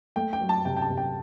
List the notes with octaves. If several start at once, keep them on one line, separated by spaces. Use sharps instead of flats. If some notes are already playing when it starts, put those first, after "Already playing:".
A3 G5
G5
F#3
A5
C3 G5
G5
A5
C3
G5